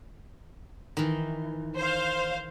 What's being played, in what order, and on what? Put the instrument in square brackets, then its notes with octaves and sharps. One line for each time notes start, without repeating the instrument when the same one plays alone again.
[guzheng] D#3 E3
[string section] C5 F5